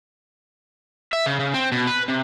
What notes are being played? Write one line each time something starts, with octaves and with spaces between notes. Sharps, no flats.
E5
C#3
C#3
C4
B2
B4
C3